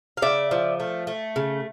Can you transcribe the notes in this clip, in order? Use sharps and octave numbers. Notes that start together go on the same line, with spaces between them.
F5
C#3 D5 E5
F3
A3
A3
C#3